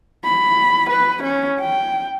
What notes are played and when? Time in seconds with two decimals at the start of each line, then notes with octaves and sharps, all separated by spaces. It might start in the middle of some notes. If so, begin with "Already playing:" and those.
0.25 B5
0.90 B4
1.23 C#4
1.60 G5